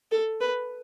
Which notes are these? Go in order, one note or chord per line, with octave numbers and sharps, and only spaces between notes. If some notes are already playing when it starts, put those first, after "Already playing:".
A4
B4